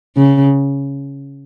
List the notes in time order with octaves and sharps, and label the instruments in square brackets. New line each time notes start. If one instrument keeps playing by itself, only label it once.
[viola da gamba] C#3